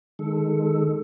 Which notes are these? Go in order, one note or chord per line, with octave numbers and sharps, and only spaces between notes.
D#3 G#3 A4